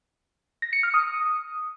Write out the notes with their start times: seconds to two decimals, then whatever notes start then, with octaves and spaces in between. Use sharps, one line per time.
0.62 A#6
0.73 C#7
0.83 F6
0.94 D#6